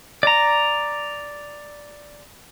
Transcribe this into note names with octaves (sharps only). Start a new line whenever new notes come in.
D5 A#5